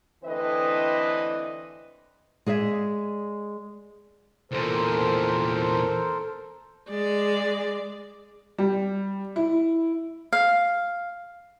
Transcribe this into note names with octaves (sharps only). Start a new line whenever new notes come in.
D3 E3 A3 C4 B4 D#5
G#3 G#4 D5 E5
E2 A#2 A4 A#4 C5
G#3 D5
G3
E4
F5